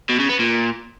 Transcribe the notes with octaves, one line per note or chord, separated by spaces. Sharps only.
B2
C#3
B3
A#2